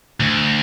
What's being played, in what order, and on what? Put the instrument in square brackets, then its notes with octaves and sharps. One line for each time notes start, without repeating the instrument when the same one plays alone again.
[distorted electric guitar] D2